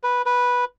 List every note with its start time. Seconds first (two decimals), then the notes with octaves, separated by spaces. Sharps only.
0.03 B4
0.26 B4